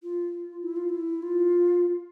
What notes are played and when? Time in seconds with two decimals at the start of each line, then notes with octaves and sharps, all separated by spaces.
0.03 F4
0.63 E4
0.76 F4
0.89 E4
1.22 F4